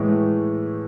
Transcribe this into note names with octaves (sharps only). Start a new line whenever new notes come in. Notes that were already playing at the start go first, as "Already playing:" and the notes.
Already playing: A2 E3 G#3
A3